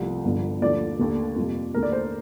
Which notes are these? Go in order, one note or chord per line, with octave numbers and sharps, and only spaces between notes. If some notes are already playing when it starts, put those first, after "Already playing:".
Already playing: C2 C3 F3 A3
G1 G2 D3 F3
D#2 D3 F3 A3 D5
D#2 D3 A3
F2 C3 G3 A#3
D#2 D3 A3 A#4
D5
C5